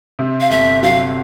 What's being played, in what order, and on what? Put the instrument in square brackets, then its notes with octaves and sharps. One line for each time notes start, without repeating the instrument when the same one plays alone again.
[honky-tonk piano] C3
[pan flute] F5
[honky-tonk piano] G1 [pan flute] E5
[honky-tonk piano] F#3 [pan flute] F5